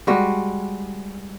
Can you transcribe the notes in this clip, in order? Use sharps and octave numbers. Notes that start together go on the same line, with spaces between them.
G3 G#3 F#4